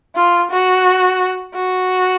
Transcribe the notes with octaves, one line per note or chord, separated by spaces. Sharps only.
F4
F#4
F#4